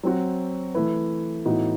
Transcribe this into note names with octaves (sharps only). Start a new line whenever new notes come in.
F#3 C4 F#4
E3 A3 E4 B4
A2 E3 B3 D#4 F#4